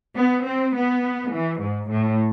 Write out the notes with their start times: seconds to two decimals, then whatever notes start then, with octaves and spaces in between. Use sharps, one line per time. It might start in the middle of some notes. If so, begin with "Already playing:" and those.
0.16 B3
0.45 C4
0.74 B3
1.31 E3
1.60 G#2
1.88 A2